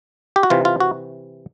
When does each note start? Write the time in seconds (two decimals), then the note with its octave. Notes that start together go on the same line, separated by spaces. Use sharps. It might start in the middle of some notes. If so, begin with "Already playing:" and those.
0.36 G4
0.43 F#4
0.50 C3 E3 F4
0.65 F4
0.80 F#4